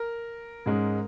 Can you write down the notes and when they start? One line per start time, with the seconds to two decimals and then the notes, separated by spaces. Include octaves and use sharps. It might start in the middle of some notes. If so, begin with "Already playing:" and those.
Already playing: A#4
0.66 G#2 G#3 C#4